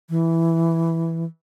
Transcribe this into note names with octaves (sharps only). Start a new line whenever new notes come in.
E3